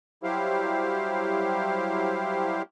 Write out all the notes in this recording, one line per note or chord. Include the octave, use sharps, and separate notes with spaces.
F#3 G3 E4 G4 C5 F5